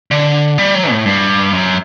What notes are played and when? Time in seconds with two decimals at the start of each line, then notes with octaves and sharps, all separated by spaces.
0.11 D3
0.58 G3
0.75 F#3
0.90 A2
1.06 G2
1.53 F#2